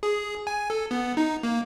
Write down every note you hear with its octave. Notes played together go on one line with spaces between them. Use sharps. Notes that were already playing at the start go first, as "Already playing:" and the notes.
G#4
G#5
A4
B3
D#4
A#3